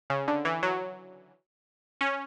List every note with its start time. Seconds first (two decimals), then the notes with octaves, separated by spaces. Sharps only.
0.10 C#3
0.28 D3
0.45 E3
0.63 F#3
2.01 C#4